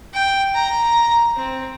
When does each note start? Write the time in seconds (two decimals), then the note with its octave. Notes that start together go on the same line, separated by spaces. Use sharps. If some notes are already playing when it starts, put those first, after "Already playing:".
0.14 G5
0.55 A#5
1.36 C4